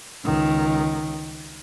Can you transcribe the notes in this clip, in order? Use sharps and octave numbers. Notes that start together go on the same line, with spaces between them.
C#2 D#3